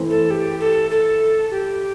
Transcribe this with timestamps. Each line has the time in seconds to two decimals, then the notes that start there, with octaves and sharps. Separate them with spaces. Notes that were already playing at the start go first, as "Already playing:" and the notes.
Already playing: E3 A3 C4 E4
0.10 A4
0.31 G4
0.60 A4
0.91 A4
1.51 G4